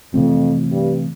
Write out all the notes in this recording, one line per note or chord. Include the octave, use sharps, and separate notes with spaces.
F2 C3 E3 A3 C4
G2